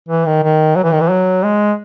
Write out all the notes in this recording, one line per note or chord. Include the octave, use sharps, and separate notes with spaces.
E3
D#3
D#3
F#3
E3
D#3
E3
F#3
G#3